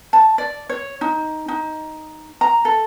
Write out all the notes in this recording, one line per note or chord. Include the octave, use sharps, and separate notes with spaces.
A5
D5
C#5
D#4
D#4
A#5
A4